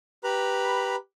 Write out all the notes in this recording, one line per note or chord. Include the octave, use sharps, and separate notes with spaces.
G4 B4 A#5 B5